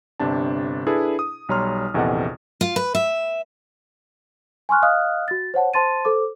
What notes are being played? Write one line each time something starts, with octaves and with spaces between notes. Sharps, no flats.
G1 C3 D4 A5
D4 E4 G#4 A4 B4
D#6
B1 G3 C#5 A#5 C6 F6
A#1 E2 C3 A4 D#5 F#5
F4
B4
E5
G#5 C6 C#6 F6 F#6
D#5 F5 D#6 F6 F#6
F#4 A6
C5 C#5 F#5 A5
C5 A5 C6 A6 D#7
A4 C5 D6